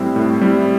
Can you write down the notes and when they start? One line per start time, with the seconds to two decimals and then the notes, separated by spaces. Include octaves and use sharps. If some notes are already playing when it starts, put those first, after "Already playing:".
Already playing: A2 G3 C4 E4
0.16 A2
0.41 G3 C4 E4